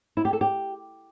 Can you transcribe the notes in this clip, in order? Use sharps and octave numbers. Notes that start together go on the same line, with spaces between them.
E4
G4
A4
G4